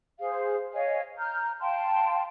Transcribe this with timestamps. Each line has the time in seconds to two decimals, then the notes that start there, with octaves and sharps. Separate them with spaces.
0.19 G#4 C5 F5
0.73 C#5 D#5 F5 G#5
1.18 A#5 F6 G6
1.61 F5 G5 A5 C6